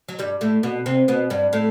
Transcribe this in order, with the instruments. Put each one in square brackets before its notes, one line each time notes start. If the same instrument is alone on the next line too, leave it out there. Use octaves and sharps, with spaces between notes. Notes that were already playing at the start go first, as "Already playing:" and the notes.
[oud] F#3
G2 G3
A2 A3
B2 B3
C3 C4
B2 B3
G2 G3
A2 A3